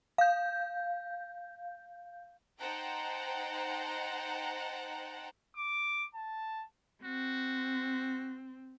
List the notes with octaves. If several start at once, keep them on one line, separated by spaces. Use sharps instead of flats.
F5 G6
D#4 C5 F#5 G5 A5 A#5
D6
A5
C4 F#4